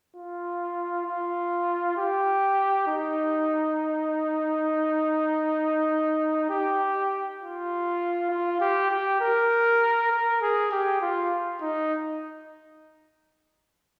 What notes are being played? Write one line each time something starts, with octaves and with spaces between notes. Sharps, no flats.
F4
F4
G4
D#4
G4
F4
F4
G4
G4
A#4
A#4
G#4
G4
F4
D#4